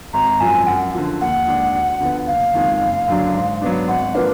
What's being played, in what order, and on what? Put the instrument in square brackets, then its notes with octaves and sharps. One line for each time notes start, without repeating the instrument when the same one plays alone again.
[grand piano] G#1 [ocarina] A#5
[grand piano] F#2 F3 [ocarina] G#5
[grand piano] F#2 [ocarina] F#5
[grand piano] D3 F3
[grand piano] D#2 [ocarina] F#5
[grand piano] D3 G#3 D4
D2
D3 F3 B3
[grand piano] F#1 [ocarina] F5
[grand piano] F2 D#3 G#3
F#1
F#2 D3 F#3 D4
G#2
F#3 B3 D4
[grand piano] G#1 [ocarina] F#5
[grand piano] F3 A#3 D4 [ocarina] B4